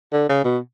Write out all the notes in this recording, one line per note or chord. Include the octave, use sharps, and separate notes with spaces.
D3
C#3
B2